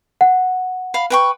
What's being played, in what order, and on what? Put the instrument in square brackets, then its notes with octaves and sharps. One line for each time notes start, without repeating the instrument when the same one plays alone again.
[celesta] F#5
[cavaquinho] F5 B5
B4 G5 C#6